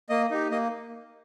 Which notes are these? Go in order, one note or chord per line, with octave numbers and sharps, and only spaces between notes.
A#3 D#5
D#4 G4
A#3 D#5